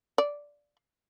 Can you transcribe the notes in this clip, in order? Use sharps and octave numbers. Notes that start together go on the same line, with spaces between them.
D5